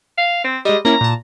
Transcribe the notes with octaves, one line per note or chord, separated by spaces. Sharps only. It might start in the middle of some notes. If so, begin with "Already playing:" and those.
F5
C4
G3 G#3 D#5
A#3 C#4 E4 A#5
A#2 A5